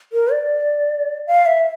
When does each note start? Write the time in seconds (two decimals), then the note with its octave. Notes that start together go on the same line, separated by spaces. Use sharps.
0.13 A#4
0.32 D5
1.27 F5
1.46 E5